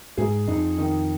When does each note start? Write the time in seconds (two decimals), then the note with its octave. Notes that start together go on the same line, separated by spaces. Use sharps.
0.17 G#2 G#4
0.48 F2 D#4
0.78 D#3